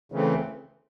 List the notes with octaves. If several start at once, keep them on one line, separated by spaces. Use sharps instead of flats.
C#3 E3 A3 C4